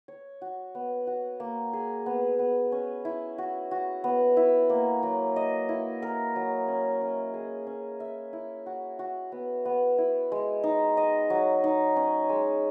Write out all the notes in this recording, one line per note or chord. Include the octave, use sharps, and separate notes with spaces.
C#5
F#4
B3
F#4
A#3
G#4
B3
B3
C#4
E4
F#4
F#4
B3
E4
A#3
F#3
D#5
E4
A#4
F#3
C#4
C#4
G#4
C#4
E5
E4
F#4
F#4
B3
B3
E4
G#3
D#4
D#5
F#3
D#4
C#4
G#3